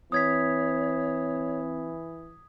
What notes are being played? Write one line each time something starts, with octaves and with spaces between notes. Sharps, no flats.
E3 C4 C#5 D#6 G#6 B6